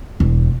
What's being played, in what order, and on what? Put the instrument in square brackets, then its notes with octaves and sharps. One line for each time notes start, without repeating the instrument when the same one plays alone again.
[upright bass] E1